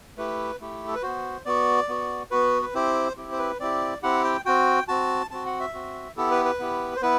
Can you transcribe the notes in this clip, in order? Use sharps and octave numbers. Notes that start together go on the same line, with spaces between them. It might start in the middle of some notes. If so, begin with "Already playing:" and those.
A3 E4 G4 B4
A3 E4 G4
A4
B4
B3 F#4 C5
B3 F#4 D5
B3 F#4
B3 F#4 B4
B4
C4 E4 G4 C5
C4 E4 G4
C5
B4
C4 E4 G4 D5
C4 E4 G4 F#5
G5
C4 F#4 G5
C4 F#4 A5
C4 F#4 A5
F#5
E5
C4 F#4
B3 E4 G4 A4
B4
B4
B3 E4 G4
C5
B3 E4 B4